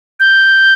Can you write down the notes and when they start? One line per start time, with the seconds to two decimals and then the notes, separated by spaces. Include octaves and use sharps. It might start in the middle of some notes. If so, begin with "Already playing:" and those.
0.20 G6